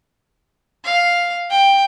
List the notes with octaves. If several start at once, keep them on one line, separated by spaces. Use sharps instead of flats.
F5
G5